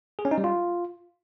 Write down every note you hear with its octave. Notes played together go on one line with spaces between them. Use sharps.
G#4
C#4
D#4
G3
F4